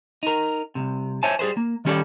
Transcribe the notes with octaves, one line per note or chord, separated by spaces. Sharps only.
D#4 A#4
C2 F2 C3
C5 C#5 E5 G#5 A5
G3 G#4 B4 C5
A#3
D#3 G3 C#4 G4 A4 D5